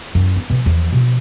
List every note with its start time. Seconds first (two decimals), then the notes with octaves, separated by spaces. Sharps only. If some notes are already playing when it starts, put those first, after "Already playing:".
0.15 F#2 E4
0.36 B3
0.50 B2 E3
0.66 E2 F3
0.93 B2 F3